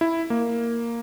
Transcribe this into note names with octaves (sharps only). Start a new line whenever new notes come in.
E4
A#3